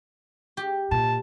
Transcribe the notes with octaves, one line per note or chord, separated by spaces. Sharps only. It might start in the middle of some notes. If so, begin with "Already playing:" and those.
G4
A#2 A5